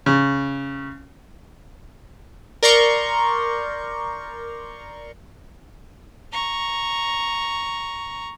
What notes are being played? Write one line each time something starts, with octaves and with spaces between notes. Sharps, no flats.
C#3
A#4 D5 A#5 C6 C#6 G6
A#5 C#6